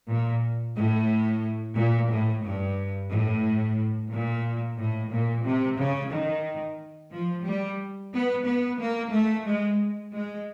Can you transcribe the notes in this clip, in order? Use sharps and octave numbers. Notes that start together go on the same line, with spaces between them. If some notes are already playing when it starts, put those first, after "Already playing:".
A#2
A2
A#2
A2
G2
A2
A#2
A2
A#2
C3
C#3
D#3
F3
G3
B3
B3
A#3
A3
G#3
G#3